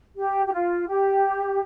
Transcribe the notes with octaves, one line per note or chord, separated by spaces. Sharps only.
G4
G4
F4
G4